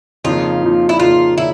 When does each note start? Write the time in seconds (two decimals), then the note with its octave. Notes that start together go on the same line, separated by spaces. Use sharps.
0.24 F2 C#3 F3 A#3 D#4 F4
0.62 F2 C#3 F3 A#3 D#4
0.89 E4
1.00 F2 C#3 F3 A#3 D#4 F4
1.38 C#3 E4